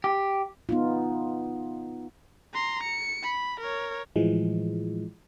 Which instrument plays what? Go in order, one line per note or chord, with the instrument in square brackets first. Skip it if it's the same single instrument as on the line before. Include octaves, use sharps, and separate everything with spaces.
[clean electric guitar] G4
[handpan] B3 D#4 F4
[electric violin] A#5 C6
C#7
B5
A#4 C#5
[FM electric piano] A2 E3 F3 G#3